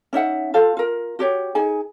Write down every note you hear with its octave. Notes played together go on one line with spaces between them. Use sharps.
C#4 D#4 E5 F#5
F4 A4 C5 F5
F4 A#4
F#4 G4 C#5
D#4 G#4 G#5